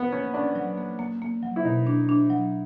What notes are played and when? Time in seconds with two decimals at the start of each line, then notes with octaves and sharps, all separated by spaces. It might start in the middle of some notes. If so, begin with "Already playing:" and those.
Already playing: B3
0.12 A#3 C#4
0.34 C#4 D4
0.55 F#3
0.77 A#3
0.99 A#3
1.22 A#3
1.43 F#3
1.56 E4
1.65 B2 D#4
1.87 D4
2.09 D4
2.30 F#3